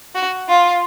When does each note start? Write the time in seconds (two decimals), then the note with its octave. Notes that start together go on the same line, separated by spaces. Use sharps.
0.15 F#4
0.48 F4